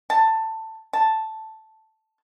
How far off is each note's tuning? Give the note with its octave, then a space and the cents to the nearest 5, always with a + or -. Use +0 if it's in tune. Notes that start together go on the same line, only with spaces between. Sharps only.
A5 +15
A5 +0